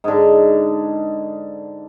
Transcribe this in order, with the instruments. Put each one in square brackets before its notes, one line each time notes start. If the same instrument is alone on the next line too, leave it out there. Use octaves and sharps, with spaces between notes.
[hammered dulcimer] G#2 D3